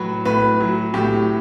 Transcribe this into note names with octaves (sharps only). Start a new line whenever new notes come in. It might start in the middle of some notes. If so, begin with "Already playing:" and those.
Already playing: A2 F#3 B4
A2 B4
F#3
A2 G4